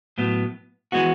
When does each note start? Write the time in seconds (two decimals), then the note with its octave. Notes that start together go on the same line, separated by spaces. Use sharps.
0.18 A2 F#3 B3
0.92 E3 G#3 B3 F#4